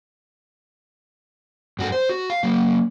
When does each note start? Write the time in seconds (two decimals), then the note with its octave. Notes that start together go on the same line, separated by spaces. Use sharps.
1.79 G2 F#4 G4 A4
1.92 C5
2.09 F#4
2.30 F5
2.43 F#3 A#3